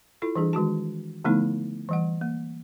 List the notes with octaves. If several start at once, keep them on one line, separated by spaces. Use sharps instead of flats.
E4 F4 A4
E3 G3 D4 G#4
D#3 G#3 F#4 A5
D3 F3 A3 B3 D#4 E4
E3 G3 F#5
A#3